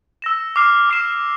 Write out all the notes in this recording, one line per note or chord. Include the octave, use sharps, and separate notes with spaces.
E6 A#6 E7
D6 F6 C7 E7
D6 F6 C7 E7